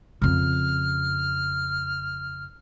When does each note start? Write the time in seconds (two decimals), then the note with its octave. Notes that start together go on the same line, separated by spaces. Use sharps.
0.22 F2 C#3 F6